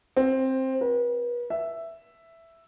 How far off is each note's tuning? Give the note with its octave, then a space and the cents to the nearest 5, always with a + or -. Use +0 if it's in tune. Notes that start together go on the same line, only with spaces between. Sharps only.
C4 +10
B4 -40
E5 +5